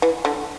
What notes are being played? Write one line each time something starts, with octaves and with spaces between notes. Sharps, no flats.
E3
D3